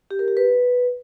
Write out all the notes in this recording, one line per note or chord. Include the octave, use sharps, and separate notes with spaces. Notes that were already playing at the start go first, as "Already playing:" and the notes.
G4
A#4
G4
B4